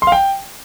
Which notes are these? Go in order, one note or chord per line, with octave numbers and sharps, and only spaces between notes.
C6
F5
G5